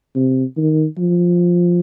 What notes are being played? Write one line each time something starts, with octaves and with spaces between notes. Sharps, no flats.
C3
D#3
F3